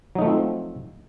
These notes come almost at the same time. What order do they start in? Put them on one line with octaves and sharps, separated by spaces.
F#3 D#4 A3 F3 C4